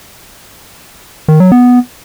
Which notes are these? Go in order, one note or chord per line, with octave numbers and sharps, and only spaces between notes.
D#3
F#3
B3